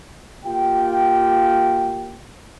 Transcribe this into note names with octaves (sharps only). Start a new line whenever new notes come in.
A#3 F4 G4 G5